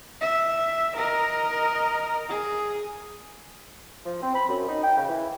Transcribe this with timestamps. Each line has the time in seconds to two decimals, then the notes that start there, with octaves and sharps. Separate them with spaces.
0.21 E5
0.95 A#4 D#5
2.29 G#4
4.06 F3
4.22 C4
4.35 B5
4.48 F#2
4.68 D#4
4.84 G5
4.96 C#3
5.09 E3